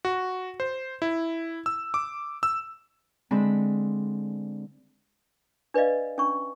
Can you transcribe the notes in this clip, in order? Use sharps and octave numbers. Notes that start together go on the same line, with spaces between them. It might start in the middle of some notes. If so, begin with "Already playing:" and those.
F#4
C5
E4
E6
D6
E6
D3 G#3 C4 B5
D4 B4 D5 D#5 F5
C#4 D4 C#6